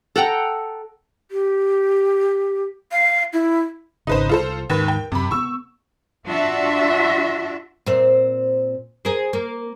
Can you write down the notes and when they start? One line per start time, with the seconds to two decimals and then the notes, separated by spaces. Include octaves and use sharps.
0.16 A4 F#5 G5 A#5
1.31 G4
2.92 F5
3.33 E4
4.07 G#1 F2 C#3 D#4 B4 C5
4.29 C2 F4 A4 C5
4.70 D#2 G#2 D#3 B4
4.88 G5
5.12 F#2 C3 B5
5.31 D#3 B3 C#6 E6
6.26 D4 F4 F#4 E5
7.86 A#2 C4 E5
9.05 G#4 A#4 C5
9.33 A#3